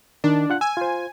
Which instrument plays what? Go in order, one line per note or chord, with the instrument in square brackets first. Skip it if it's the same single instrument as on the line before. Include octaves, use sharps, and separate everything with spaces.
[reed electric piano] D#3 [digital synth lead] D4
[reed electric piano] F4 F#5 F#6
[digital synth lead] G#5 [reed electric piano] E6
[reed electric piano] F4 C5